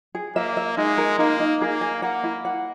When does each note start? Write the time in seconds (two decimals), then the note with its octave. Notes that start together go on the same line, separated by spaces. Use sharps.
0.15 G#4
0.36 A#3 E5
0.57 E5
0.77 G#3 D#4
0.98 A#4
1.19 A#3 D#4
1.40 D#4
1.62 A#3 G#4
1.81 G#5
2.02 A#3 F#5
2.24 E4
2.45 F#5